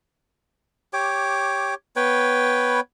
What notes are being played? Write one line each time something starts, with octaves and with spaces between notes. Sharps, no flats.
G4 C#5 D6
B3 B4 C#5 G5